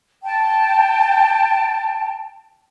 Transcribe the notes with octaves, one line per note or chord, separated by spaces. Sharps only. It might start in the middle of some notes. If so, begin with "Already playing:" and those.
G5 A5